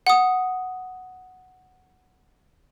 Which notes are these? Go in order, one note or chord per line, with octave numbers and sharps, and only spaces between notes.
F#5 D#6